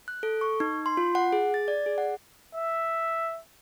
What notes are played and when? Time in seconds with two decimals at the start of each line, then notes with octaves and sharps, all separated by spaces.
0.08 F#6
0.23 A4
0.41 C#6
0.60 D#4
0.86 C6
0.97 F4
1.15 F#5
1.32 G#4
1.54 A6
1.68 D5
1.86 G#4
1.98 F#5
2.55 E5